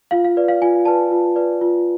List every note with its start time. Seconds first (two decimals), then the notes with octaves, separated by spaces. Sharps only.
0.11 F4 F5
0.24 F5
0.37 B4 D5
0.48 F5
0.62 F4 G#5
0.85 B4 D5 A5
1.11 F4
1.36 B4 D5
1.61 F4